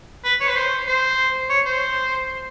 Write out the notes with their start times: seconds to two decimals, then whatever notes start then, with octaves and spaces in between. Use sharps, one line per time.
0.24 B4
0.40 C#5
0.49 B4
0.56 C5
0.87 C5
1.49 C#5
1.66 C5